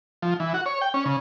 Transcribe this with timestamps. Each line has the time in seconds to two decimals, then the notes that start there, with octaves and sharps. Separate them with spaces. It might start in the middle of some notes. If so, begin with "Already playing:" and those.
0.22 F3
0.40 E3
0.54 F#4
0.66 C#5
0.81 G5
0.94 C#4
1.05 C#3